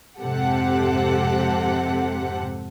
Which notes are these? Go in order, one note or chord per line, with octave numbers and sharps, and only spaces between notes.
F2 G#2 C3 G4 A4 F#5